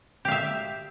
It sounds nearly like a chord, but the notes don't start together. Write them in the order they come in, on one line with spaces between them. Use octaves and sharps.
G4 F5 E5